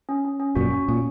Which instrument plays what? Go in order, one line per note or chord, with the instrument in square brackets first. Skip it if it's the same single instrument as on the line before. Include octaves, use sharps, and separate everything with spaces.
[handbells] C#4
C#4
C#4
[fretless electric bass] F#2 A#2 [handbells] F#4
[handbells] C#4
[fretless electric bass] A#2 [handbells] C#4